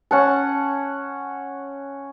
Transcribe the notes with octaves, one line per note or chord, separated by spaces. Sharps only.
C#4 F#5 A5